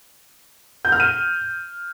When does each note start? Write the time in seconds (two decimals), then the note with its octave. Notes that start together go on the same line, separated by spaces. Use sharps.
0.85 G6
0.92 F6
1.00 D#7